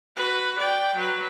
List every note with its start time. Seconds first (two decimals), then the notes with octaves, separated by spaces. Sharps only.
0.16 F#4 B4
0.59 D5 G5
0.95 F#3 B4